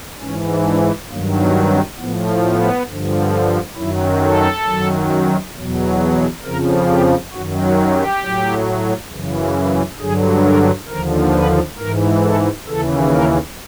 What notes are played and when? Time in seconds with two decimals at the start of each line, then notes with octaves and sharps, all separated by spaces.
0.20 G#2 E3 C#4
0.64 D4
1.09 G2 D#3 F#3 A#3
1.39 B3
1.69 C4
1.98 A2 F3 B3
2.43 B3
2.87 G2 D3 F3
3.77 F#2 D#3 F#3 E4
4.21 A4
4.65 F#2 D#3 F#3
5.55 E2 B2 F#3
6.43 F2 C#3 F3 A#4
6.88 G4
7.32 F#2 D#3 F#3 F#4
7.63 F#4
7.92 G4
8.22 A2 F#3
9.11 F#2 C#3 E3
10.00 G2 D3 F#3 G#4
10.44 A#4
10.88 D#2 D3 F3 A#4
11.33 B4
11.78 G#2 E3 A#4
12.22 A4
12.67 D#2 C#3 E3 A4
13.12 A#4